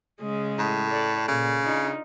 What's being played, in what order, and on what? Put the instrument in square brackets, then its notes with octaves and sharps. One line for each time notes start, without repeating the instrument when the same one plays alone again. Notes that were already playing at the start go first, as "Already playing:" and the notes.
[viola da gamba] C#3 G#3 G#4
[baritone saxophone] A2
[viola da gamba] A4 D5
[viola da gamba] A#2 [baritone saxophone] C#3
[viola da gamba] D4 D#4 F4